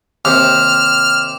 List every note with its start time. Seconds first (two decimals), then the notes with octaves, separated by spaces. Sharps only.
0.25 D#2 C3 D6 F6